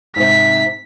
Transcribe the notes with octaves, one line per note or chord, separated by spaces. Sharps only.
G#2 C3 B6